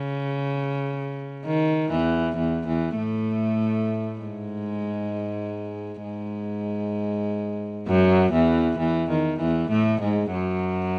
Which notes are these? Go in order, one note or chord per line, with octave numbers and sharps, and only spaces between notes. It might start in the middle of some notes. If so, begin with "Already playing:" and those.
Already playing: C#3
D#3
E2 E3
E2 E3
E2 E3
A2 A3
G#2 G#3
G#2 G#3
F#2 F#3
E2 E3
E2 E3
D#3
E2 E3
A2 A3
G#2 G#3
F#2 F#3